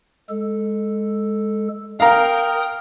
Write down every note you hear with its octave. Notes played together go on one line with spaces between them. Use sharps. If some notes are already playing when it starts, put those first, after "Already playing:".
G#3 A4
A#4 F5 G5 A#5 D#6 F6